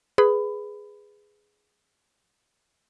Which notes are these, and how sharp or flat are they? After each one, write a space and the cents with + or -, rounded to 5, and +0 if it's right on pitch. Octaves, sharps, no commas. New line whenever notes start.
G#4 +0 B4 +5 B5 +20